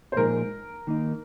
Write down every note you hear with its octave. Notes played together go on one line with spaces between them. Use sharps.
C5
A#2 F3 G#3 D#4 G#4 A#4
D#3 A#3 D#4